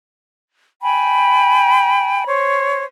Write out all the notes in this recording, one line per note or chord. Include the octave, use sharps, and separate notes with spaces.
G5 G#5 B5
C5 C#5